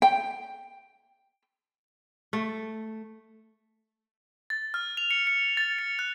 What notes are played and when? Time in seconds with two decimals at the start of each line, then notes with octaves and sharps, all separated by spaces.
0.02 G5
2.33 A3
4.50 A6
4.74 F6
4.97 F7
5.11 C#7
5.27 C#7
5.57 A6
5.79 C#7
5.99 F#6